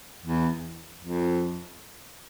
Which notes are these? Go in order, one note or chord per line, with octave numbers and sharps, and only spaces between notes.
E2
F2